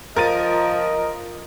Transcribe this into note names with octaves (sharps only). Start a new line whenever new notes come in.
F3 F4 A#4 D#5 A6 D#7